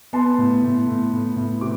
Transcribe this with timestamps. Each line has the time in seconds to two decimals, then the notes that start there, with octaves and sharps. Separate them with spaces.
0.13 B3 A5 C6
0.38 A2
0.63 A2
0.87 A2
1.13 A2
1.36 A2
1.61 C3 D6